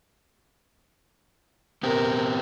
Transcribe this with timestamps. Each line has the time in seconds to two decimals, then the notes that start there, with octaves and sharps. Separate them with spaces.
1.83 B3 C4 G4 A#4